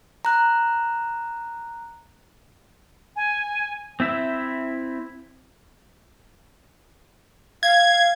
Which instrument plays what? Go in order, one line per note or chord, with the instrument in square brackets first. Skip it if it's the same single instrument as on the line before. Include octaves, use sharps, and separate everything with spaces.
[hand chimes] A#5 F#6
[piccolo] G#5
[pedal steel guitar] C4 E4 E5
[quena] F5 [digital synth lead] G#6